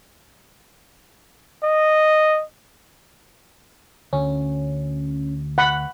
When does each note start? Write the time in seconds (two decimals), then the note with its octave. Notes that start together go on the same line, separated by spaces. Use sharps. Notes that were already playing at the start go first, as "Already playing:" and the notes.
1.63 D#5
4.13 D2 C#4
5.58 F#5 B5